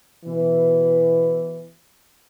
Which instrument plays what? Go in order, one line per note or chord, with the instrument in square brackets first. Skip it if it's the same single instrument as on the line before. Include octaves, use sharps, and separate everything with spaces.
[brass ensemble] B2 E3